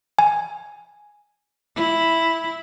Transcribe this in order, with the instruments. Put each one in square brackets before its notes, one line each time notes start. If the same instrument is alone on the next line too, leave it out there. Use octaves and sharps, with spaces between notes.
[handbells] G#5
[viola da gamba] E4